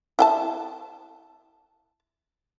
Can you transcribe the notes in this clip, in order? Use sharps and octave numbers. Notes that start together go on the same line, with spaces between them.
E4 G5 A5